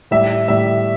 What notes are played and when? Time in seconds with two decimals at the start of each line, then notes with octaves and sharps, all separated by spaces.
0.11 A2 G3 E5
0.48 A2 G3 E5